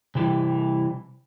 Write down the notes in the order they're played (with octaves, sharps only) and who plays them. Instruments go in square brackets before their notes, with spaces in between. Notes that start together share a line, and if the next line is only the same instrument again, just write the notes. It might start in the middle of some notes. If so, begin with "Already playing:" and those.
[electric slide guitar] C3 E3 G3